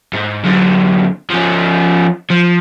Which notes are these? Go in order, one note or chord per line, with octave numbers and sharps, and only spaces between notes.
G#2
F#2 D3
F3 C#4
F3